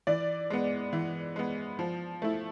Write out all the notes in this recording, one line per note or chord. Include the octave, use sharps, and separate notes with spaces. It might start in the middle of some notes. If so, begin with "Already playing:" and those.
E3 D5
G#3 B3
E3
G#3 B3
F3
A3 E4